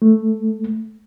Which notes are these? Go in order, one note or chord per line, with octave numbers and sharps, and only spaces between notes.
A3